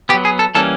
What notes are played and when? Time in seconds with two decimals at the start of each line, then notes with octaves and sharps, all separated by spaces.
0.09 B3 G4
0.14 F#3
0.25 G#4
0.39 A4
0.55 E3 G3 A#3 C#4 A4